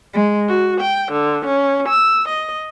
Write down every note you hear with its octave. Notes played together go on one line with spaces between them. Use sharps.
G#3
F#4
G5
D3
C#4
E6
D#5